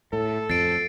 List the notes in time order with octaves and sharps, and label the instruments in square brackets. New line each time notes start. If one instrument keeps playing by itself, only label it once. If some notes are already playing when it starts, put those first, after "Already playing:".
[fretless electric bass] A2 [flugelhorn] A4
[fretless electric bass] F2 [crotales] A6 C7 D7